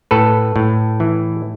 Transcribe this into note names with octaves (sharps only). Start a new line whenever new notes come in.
A2 A4 B4
A2
E3